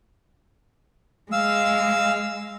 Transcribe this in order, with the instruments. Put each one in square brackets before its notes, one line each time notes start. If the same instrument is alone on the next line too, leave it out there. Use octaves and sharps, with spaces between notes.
[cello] G#3 [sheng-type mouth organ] F5 E6